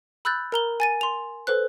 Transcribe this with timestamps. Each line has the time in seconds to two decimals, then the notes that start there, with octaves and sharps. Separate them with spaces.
0.25 B5 E6 F#6 G6 A6
0.52 A#4 A#5 G7
0.80 G#5 A6 D#7
1.01 C6 F7
1.47 A4 B4 C5 F#6